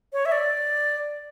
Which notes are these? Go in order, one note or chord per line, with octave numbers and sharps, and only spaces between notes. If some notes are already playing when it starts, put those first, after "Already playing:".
C#5
E5
D5